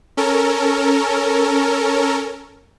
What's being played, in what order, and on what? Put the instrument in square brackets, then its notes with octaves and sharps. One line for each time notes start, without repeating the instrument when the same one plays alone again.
[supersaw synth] C#4 A4 A#4